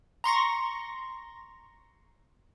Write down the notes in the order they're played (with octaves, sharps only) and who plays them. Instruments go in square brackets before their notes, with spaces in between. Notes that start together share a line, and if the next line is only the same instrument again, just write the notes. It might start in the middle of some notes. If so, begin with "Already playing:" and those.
[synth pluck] A#5 C6 C#6 A#6